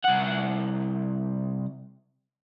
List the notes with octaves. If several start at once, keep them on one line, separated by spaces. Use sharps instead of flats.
C2 F#5